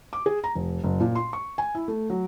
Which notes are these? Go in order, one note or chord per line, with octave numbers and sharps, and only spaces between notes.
D6
G#4
A#5
F1
F#1
A#2
C6
C#6
G#5
E4
A3
F#3